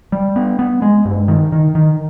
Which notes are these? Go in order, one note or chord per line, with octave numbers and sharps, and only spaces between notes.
G3
B3
B3
G#3
G2
D#3
D#3
D#3